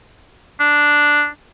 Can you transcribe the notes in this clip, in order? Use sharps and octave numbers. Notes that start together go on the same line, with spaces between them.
D4